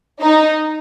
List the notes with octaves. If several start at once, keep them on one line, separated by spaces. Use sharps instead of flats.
D#4